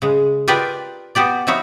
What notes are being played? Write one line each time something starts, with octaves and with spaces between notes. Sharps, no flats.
C#3 G#3
F4 G4 A#4 B4 D5 D#5
B3 F#4 G4 D5
F3 D#4 E4 F#4 C#5 F5